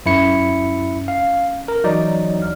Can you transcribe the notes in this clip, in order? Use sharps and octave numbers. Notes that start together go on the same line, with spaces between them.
F#2 C#4 E4 C#7
F5
A#4
E3 F#3 D#4 D5
D2 F6